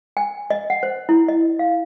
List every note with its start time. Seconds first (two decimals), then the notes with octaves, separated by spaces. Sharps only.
0.17 G#5
0.50 D#5
0.70 F#5
0.83 C5
1.09 E4
1.28 D#5
1.59 F5